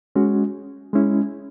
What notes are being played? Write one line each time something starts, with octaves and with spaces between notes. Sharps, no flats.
G#3 C#4 F#4
G#3 C#4 E4